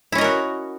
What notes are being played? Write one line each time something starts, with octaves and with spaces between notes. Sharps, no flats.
C#4 E4 F#4 A#4 D#5